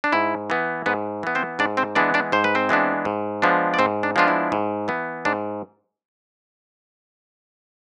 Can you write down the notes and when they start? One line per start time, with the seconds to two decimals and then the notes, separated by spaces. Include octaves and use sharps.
0.04 D4
0.12 G#2 E4
0.50 E3 B3
0.86 G#2 B3 B4
1.23 E3 B3
1.35 C4 C5
1.59 G#2 D4 D5
1.77 C4 C5
1.95 E3 G#3 B3 D4 D5
2.14 D4 D5
2.32 G#2 C5
2.44 B4
2.55 C4 C5
2.69 E3 G#3 B3 D4
3.05 G#2
3.42 F3 G#3 B3 D4
3.74 D5
3.78 G#2 C4 C5
4.03 D4
4.16 F3 G#3 B3 D4 F4
4.28 E4
4.52 G#2
4.88 E3 B3
5.25 G#2 D4